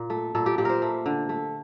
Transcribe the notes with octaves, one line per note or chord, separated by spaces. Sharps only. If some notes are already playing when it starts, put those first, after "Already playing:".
Already playing: A#2
A3
A#2 A4
G4
A#2 G4
A#4 C5
A3
D3
A3